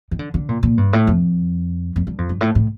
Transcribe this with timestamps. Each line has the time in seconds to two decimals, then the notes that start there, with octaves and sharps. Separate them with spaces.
0.11 D#3
0.19 D3
0.34 D3
0.49 A#2
0.63 A#2
0.78 G2
0.93 A2
1.07 F2
1.96 F2
2.07 G2
2.18 F2
2.29 G2
2.41 A2
2.55 A2